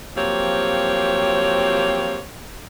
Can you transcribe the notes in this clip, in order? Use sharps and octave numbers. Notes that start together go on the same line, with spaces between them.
F3 F#3 A#3 C4 G4 C#5